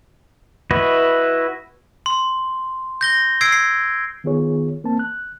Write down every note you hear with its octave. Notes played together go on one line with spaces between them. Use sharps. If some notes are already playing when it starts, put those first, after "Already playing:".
E4 F#4 B4 D#5
C6
G6 A#6 G7
E6 G#6 C7 D7
C7
D#3 B3 F4 G#4 C#5
A#3 C4 A5
F#6